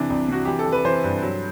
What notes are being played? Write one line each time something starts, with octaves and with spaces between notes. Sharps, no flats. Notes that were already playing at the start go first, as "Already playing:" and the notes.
Already playing: C3 E3 D4
C2
C3 F#4
E3 G4
A4
E3
B4
E3 C5
G2
F#3